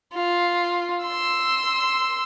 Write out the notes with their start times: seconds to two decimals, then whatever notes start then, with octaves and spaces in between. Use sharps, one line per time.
0.14 F4
1.05 C6 E6